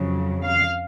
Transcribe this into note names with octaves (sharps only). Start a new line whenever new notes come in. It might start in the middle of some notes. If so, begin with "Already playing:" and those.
Already playing: F2 C#3 F#3
F5